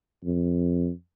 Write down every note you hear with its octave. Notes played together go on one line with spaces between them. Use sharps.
F2